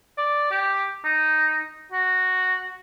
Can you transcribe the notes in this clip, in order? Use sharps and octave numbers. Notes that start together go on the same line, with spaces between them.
D5
G4
D#4
F#4